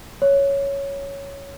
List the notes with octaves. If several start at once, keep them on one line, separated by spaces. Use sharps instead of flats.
C#5